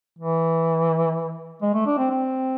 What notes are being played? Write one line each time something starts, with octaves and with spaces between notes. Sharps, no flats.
E3
G#3
A3
D4
C4
C4